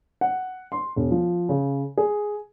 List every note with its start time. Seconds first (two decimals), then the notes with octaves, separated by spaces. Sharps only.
0.21 F#5
0.72 C6
0.96 E1
1.11 F3
1.49 C#3
1.97 G#4